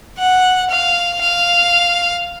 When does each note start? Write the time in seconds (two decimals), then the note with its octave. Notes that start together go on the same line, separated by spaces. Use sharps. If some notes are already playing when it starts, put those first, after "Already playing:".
0.18 F#5
0.70 F5
1.21 F5